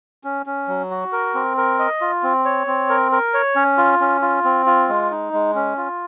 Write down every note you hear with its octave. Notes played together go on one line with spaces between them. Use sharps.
C#4
C#4
F#3
F#4
A#4
C4
A#4
D#5
F4
C4
C#5
C4
A#4
A#4
C#5
C#4
F4
C#4
F4
C4
F4
G#3
D#4
G#3
C#4
F4